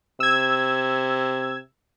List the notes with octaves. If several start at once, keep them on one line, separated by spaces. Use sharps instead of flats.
C3 E6 G#6